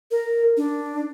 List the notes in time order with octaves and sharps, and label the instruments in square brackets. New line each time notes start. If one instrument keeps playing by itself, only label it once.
[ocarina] A#4
D4